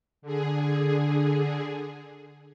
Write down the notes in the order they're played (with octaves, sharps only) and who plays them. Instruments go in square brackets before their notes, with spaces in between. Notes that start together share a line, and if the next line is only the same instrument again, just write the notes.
[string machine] D3 G#4